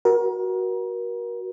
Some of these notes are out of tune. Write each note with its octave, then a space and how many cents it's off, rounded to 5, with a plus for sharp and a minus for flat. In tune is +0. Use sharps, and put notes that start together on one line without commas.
F#4 +10 A#4 +30